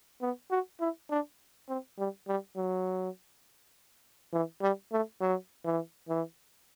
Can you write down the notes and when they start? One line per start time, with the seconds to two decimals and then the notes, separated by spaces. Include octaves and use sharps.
0.22 B3
0.51 F#4
0.80 E4
1.10 D4
1.69 C4
1.98 G3
2.28 G3
2.57 F#3
4.33 E3
4.62 G3
4.92 A3
5.21 F#3
5.65 E3
6.09 E3